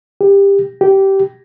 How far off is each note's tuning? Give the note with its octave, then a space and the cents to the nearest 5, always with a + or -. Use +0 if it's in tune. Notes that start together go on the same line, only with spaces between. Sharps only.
G4 +20
G4 -15